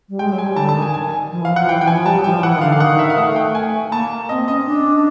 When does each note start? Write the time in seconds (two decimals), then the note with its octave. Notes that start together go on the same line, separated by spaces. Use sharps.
0.09 G3
0.19 G#3 G5
0.32 F#3
0.38 G#5
0.45 G3
0.56 D3 A5
0.69 A5
0.75 D#3
0.82 G#5
0.94 G#5
1.31 F3
1.41 E3
1.45 F3 F5
1.56 F3 F#5
1.69 E3 G5
1.81 E3 G5
1.87 G#5
1.94 F3
2.06 G3 A5
2.18 F#3
2.24 E3 G5
2.31 F3
2.43 E3 F#5
2.55 D#3
2.61 D3 F5
2.72 F5
2.76 D3
2.80 D#3 F#5
2.99 E5
3.10 F5
3.18 A3 F#5
3.36 G5
3.55 G#5
3.91 A#3 A5
4.29 C4 D#5
4.48 C#4 D#5
4.66 D4